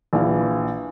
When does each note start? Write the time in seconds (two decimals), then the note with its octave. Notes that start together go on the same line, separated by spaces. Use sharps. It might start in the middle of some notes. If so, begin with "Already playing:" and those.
0.13 A#1 E3 F5